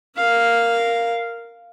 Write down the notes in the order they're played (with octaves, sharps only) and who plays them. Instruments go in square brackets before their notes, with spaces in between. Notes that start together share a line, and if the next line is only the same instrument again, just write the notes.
[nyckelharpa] A#4 F5